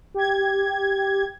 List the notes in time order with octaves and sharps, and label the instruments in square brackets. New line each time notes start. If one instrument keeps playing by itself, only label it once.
[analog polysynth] G4 G#6